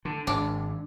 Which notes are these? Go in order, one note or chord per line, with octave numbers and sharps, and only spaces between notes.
D3
G#1 D4